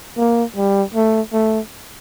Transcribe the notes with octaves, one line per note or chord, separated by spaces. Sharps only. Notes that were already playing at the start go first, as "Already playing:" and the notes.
A#3
G3
A3
A3